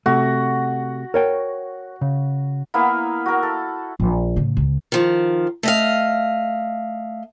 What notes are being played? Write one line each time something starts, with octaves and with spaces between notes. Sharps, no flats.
C3 A3 F#4
A#4 C#5 G5
C#3
A#3 B3 E4 F5
F#4 A#4
A4
A#1
A2 C#3
C#2
D#3 F3
A3 D#5 F5